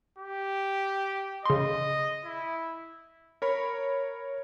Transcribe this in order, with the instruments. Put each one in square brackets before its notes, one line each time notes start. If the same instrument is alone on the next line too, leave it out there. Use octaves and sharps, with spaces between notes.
[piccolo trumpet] G4
[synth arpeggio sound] C#3 C6 [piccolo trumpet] D#5
[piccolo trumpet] E4
[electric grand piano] A#4 C#5 B5